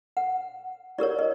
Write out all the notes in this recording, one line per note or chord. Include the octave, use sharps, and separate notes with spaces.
F#5
E4 G4 A#4 C#5 D5
D#5